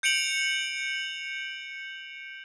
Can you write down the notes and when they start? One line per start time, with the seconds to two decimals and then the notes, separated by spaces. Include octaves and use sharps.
0.03 G6 C#7 D7 F7 F#7